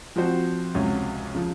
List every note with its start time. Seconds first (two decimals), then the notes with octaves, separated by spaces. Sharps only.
0.16 F3 C4 F#4 C5
0.74 C#2 C3 F#3 C#4
1.34 C#3 F3